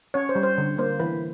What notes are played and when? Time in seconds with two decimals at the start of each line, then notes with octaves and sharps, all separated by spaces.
0.14 C#4 C#5
0.29 C5
0.35 G3
0.43 C5
0.58 D3
0.78 A#3 C5
1.00 E3 B4